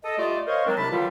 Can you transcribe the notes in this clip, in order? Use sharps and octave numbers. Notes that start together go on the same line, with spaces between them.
A4 D#5
G3 A3 F4 D5 D#5
A#4 C5 C#5 D#5 F5 C#6
D#3 F#3 G#3 C4 D4 A#4
C2 C3 D4 A5 B5
B2 D3 D#3 F#3 G3 F4